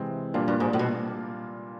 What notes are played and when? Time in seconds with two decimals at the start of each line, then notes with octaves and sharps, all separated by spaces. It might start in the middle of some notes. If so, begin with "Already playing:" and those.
Already playing: C3 E3 G#3 C4
0.34 G2 A#2 G3 A#3 D4 F4
0.48 G2
0.60 G#2
0.73 A2
0.79 B2